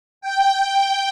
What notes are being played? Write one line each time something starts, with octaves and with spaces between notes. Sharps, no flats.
G5